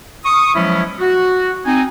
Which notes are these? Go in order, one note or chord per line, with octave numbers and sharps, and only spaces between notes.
C#6 D#6
F3 F#3 G#3 B3 C#4 E4
F#4
C4 D#4 G#5